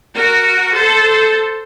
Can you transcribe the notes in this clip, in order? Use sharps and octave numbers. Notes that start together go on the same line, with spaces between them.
F#4 A#4
A4 C5